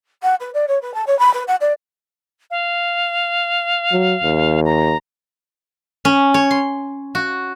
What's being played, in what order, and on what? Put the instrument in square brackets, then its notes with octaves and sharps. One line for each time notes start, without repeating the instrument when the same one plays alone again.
[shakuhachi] F#5
B4
D5
C#5
B4
A5
C#5
B5
B4
F#5
D5
[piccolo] F5
[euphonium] F#3
D#2
[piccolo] A#5
[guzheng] C#4
C#5
C6
F#4